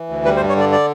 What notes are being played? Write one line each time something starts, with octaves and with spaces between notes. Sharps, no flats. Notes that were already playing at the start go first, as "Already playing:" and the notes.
Already playing: E3
D2
G3 B4
C5
G2
C#5
D3 D5
D5